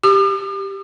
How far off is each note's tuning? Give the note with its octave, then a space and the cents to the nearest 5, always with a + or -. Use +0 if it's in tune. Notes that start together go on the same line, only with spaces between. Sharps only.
G4 +0 D6 +45